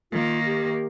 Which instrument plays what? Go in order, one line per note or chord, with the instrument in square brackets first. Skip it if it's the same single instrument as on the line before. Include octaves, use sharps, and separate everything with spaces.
[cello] D#3 A#3 [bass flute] F4
[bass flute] G4